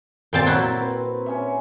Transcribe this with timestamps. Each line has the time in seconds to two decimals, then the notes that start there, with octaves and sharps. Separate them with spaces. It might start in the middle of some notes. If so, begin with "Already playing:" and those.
0.33 A#2 C4 F#4 A#4 A5
0.46 F#3 E4
0.79 C4 B4
1.26 C#4 G#4 E5